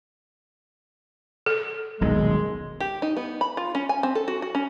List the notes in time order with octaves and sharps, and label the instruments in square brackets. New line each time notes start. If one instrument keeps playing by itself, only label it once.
[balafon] A4
[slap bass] D#1 B1 D#3 [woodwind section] G#3
[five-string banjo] G4
D#4
B3
B5
F4
C#4
G#5
C4
A4
F#4
F#4
C#4